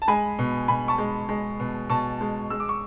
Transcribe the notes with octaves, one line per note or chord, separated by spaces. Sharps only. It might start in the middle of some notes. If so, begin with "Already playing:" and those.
A5
G#3 G#5 B5
B2
B2 G#5 B5
A5 C#6
G#3
G#3
B2
B2 A5 C#6
G#3
G#3 E6
D6
C#6